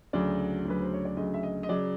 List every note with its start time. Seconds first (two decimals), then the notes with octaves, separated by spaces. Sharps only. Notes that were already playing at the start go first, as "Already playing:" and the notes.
0.13 D2 C#3 F#3 D5
0.65 D2 C#3 F#3 B4
0.82 C5
0.93 C#5
1.05 D5
1.17 D2 C#3 F#3 D#5
1.34 E5
1.43 D#5
1.63 D#5
1.69 C#3 F#3 D5